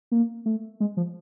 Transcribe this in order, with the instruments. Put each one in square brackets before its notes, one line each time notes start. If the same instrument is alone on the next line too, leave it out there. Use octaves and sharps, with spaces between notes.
[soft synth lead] A#3
A3
G#3
F3